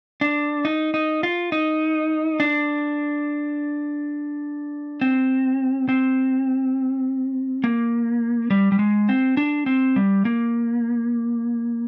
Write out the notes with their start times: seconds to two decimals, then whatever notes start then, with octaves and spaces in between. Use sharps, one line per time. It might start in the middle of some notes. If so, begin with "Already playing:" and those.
0.21 D4
0.65 D#4
0.94 D#4
1.23 F4
1.52 D#4
2.40 D4
5.01 C4
5.89 C4
7.64 A#3
8.51 G3
8.72 G3
8.79 G#3
9.09 C4
9.37 D4
9.66 C4
9.96 G3
10.25 A#3